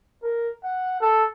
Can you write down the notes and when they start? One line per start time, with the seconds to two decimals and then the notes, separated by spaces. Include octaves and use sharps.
0.23 A#4
0.64 F#5
1.00 A4